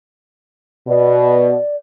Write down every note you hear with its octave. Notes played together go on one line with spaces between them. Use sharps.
B2 D5